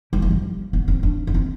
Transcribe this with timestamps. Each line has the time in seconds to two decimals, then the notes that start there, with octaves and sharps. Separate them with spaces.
0.13 G3
0.22 F3
0.31 G3
0.73 B3
0.88 C4
1.03 D4
1.27 B3
1.34 C4